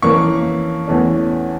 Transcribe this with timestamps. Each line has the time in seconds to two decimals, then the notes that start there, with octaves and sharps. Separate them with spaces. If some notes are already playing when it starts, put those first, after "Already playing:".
0.02 F2 E3 A#3 C#4 C#6
0.87 E2 E3 A3 C#4